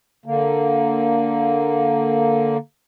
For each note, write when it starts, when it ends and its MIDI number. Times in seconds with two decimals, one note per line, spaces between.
0.26 2.57 50
0.26 2.57 58